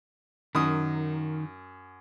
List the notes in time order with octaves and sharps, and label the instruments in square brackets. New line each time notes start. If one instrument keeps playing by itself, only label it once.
[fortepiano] F#2 D#6 [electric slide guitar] D#3